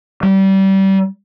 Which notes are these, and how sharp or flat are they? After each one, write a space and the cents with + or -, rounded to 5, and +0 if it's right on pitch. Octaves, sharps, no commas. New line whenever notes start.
G3 -25